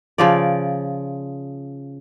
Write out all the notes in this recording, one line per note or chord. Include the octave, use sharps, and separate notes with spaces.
C#3 F3 D5